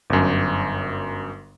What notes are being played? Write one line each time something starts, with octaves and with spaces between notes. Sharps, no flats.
G1 F#2